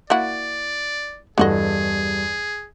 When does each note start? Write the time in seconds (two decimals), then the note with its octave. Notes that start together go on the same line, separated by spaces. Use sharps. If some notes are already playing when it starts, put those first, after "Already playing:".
0.10 A#3 E4 F#4 D5
1.38 E2 G2 D3 F#4 G#4 A4 D#5